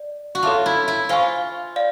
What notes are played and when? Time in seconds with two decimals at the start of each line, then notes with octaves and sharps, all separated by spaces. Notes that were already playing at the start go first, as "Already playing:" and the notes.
Already playing: D5
0.35 F#4
0.43 F4 A4 C#5 E5 A5 D6
0.66 E4
0.88 E4
1.09 F4 C5 F5 G#5 C#6
1.76 D5 F5